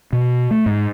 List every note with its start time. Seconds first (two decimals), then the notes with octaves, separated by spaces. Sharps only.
0.13 B2
0.51 A3
0.66 G#2